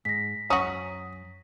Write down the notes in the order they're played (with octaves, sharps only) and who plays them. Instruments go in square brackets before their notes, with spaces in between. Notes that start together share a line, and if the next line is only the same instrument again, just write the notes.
[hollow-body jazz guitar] G#2 [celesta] A#6 B6
[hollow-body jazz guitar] F#2 A#5 [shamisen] C#4 F#4 [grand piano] D#6